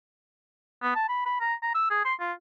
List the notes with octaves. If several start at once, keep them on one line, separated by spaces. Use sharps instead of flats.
B3
A5
B5
B5
A#5
A#5
E6
G#4
C6
F4